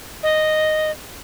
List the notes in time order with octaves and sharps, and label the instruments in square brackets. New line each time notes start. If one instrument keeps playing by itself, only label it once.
[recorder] D#5